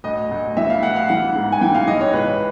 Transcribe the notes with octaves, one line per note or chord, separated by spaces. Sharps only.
D2 D#5
D2
E3 E5
F5
D2 F#5
F5
E3 F#5
G#2
G#5
E3 G5
F5
E3 D#5
C#5
C#2 B4